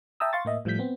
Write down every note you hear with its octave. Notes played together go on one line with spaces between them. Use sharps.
E5 G5 A5 A#5 D#6 E6
F5 C6 C#6 A6
A2 A#3 D#5 E5
A2 F3 G3 A3 G6 B6
B3 C4